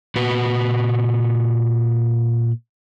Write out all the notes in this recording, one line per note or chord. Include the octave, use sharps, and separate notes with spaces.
A#2 F#4 B4